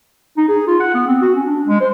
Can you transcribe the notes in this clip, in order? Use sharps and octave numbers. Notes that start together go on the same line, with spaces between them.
D#4
G#4
F4
F#5
B3
C4
F#4
C#4
D4
G#3
C5